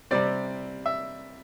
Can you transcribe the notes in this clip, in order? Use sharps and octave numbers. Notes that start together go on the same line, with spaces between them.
C3 G3 C4 D5
E5